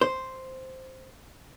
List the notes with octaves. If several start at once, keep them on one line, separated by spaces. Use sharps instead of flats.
C5